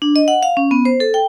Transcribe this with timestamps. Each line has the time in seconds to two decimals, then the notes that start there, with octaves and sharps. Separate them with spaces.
0.02 D4
0.16 D#5
0.28 F#5
0.43 F5
0.57 C#4
0.71 B3
0.85 C5
1.00 A4
1.14 G5